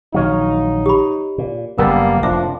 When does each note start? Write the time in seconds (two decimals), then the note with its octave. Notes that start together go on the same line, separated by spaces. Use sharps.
0.14 A#1 D#3 F#3 D#4 C#5 F5
0.86 G4 B5
1.38 A#2
1.78 F#1 G3 A#3 B3 A#4 A5
2.23 F1 A2 F3 D4 E5